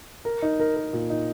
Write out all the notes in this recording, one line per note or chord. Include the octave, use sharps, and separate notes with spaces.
A#4
D#4
A#4
A#4
A#2
D#4